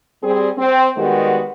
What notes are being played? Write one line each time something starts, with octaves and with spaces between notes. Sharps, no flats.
G3 C4 G#4
C4
D#3 G3 G#3 B3 F#4 G4